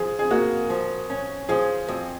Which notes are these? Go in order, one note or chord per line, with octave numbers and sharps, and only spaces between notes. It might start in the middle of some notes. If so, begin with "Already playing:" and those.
Already playing: F3 G#4
G#4
A#3 F#4
F3
C#4
F3 G#4
F2